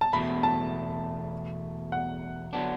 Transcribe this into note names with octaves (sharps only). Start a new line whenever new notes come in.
A5
E2 B2 A3 B5
A5
F#5
D3 F#3 B3 D4